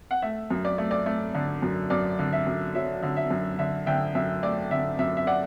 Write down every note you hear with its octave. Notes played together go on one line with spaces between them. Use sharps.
F#5
A3 E5
F#2
D5
A3
D5
A3
D3
F#2
F#2 D5
D3
E5
F#2
F#3 E5
D3
E5
F#2
D3 E5
D3 E5 G5
F#2 E5
A3 D5
D3 E5
F#2 E5
E5
D5 F#5